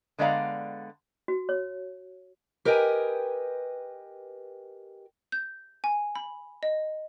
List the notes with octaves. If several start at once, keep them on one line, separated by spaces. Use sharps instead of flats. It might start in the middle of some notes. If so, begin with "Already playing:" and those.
D3 G#3 B3 D5 F5 A#5
F#4
C#5
G4 A#4 B4 D#5 G5 G#5
G6
G#5
B5
D#5